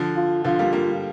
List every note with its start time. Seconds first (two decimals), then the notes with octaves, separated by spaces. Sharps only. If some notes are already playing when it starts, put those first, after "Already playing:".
Already playing: D3 F3
0.16 F4
0.44 D3 F3 F4
0.59 G3 A#3
0.73 G3 A#3